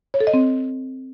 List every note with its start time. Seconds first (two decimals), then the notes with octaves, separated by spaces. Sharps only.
0.14 C#5
0.21 A4
0.27 D#5
0.34 C4